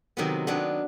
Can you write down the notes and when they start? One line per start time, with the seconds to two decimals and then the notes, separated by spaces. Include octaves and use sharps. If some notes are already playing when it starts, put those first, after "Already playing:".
0.17 C3 D#3 F#3 B3
0.47 D#3 F#3 B3 D4